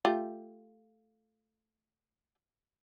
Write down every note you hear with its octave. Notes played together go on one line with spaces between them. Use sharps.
A3 F4 G4